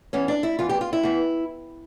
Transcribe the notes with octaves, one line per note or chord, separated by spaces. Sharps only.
E2 E3 C#4
D4
E4
E2 E3 F4
G4
F4
E4
E2 E3